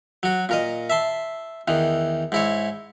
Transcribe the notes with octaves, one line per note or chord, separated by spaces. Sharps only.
F#3 F#4
A#2 A#4 D#5
E5 A5 C6
E2 D#3 E3
G#2 E4 C#5